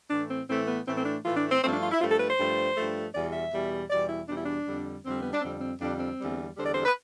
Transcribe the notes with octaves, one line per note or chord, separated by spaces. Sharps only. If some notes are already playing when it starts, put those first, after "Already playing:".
A2 E3 A3 D4
C4
A2 E3 A3 C4
B3
A2 E3 A3 C4
C4
D4
A2 E3 A3 F4
D4
C4
G2 F3 A3 C4
D4
F4
E4
G2 F3 A3 F4
A4
B4
C5
G2 F3 A3
G2 F3 A3
E2 B2 G3 D5
E5
E2 B2 G3
E2 B2 G3 D5
E4
E2 B2 G3 D4
E4
D4
F2 D3 G3
F2 D3 G3 C4
B3
D4
F2 D3 G3 C4
C4
F2 D3 G3 D4
C4
E2 D3 G3
E2 D3 G3 C5
D5
C5
B4